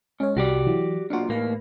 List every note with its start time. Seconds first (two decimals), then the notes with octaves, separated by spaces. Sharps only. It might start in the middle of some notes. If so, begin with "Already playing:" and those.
0.20 G#2 C#4 C#5
0.37 C2 F#4 G4 D5
0.67 E3 F#3
1.10 B1 A#2 D4 F#4
1.29 E2 A2 A#3 B4